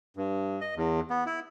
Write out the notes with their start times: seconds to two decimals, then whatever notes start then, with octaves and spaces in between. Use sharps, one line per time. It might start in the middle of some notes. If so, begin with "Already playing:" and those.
0.17 G2
0.61 D#5
0.77 E2
1.10 B3
1.26 E4